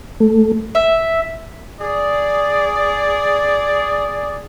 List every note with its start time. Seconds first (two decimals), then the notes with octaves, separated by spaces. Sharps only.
0.20 A3
0.75 E5
1.80 G#4 D5